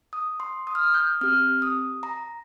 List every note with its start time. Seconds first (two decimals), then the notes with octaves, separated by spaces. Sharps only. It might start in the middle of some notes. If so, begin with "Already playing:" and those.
0.13 D#6
0.40 C6
0.67 D#6
0.75 F6
0.83 D#6
0.94 G6
1.21 C4 G4 F6
1.62 D#6
2.03 A#5